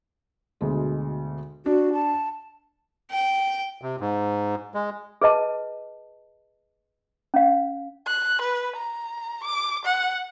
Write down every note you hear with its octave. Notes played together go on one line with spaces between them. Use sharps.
D2 B2 G#3
D4 F#4 D5
A5
G5
C3
G#2
G#3
G#4 B4 D#5 A5
C#4 F5
F#6
B4
A#5
D6
F#5